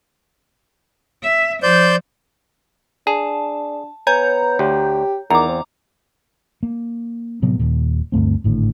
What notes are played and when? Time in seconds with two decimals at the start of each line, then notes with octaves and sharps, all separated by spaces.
1.23 E5
1.63 F3 C5 D5 G6
3.07 D4 G#4 A5
4.07 B3 C#5 G#5 A#5 G6
4.59 D2 G4
5.30 E2 D#3 A#5 D6
5.49 C4
6.63 A#3
7.42 A2 C3 F#3 B3
7.59 D#1 D#2 A#2
8.12 D2 G2 A3 C4
8.44 G#1 A2 D3